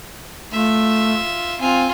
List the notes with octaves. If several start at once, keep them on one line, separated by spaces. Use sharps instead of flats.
A3 F4 E5
C4 F4 G#5